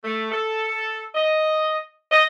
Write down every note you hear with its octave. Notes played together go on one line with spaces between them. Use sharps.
A3
A4
D#5
D#5